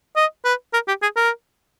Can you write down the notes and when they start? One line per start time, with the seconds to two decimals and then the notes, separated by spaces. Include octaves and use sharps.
0.16 D#5
0.45 B4
0.73 A#4
0.88 G4
1.02 G#4
1.17 A#4